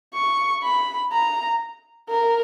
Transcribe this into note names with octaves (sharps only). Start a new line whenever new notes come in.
C#6
B5
A#5
A#4